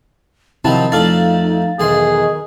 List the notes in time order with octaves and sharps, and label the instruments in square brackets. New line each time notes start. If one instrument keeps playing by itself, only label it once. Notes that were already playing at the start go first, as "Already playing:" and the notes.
[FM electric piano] C3 E4 A5 [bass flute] D#3 [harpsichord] F3 F#3 C4
[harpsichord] F2 A3 D5 [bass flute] D#4 [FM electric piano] F5 A6
[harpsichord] B1 E2 C6 [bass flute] D#3 [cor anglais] G#4